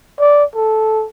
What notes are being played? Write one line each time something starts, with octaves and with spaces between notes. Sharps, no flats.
D5
A4